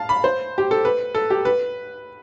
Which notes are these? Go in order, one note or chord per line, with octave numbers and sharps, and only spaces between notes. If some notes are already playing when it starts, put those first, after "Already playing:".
Already playing: F5 A5
B5
C5
G4
A4
B4
A4
G4
B4